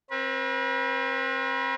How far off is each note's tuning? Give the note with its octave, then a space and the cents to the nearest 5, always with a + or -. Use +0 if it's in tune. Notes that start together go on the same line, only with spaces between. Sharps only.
C4 +30 B4 -35